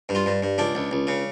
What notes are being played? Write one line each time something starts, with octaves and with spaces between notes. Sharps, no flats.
G2
F4
G2
G2
C#2 D4
C#2
C#2
C#3